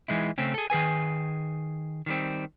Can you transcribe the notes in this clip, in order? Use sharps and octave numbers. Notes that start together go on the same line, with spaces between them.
E3 G#3 D#4 E4
C#3 A3 C4 C#4
G#4 A4
D#3 G#4 B4 G#5
D#3 G3 C4